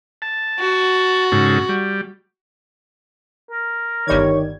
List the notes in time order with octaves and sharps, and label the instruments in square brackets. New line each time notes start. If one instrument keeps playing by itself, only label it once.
[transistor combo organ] A5
[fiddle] F#4
[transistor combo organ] G#2 C#3 A4
G3
[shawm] A#4
[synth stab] G1 G3 G#6 [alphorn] D#3 [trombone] C#5